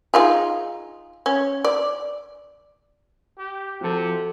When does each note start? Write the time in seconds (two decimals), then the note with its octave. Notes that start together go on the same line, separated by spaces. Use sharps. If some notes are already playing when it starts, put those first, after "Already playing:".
0.14 D#4 F4 G#4
1.26 C#4
1.64 D5
3.38 G4
3.81 C3 F3 F#4 A4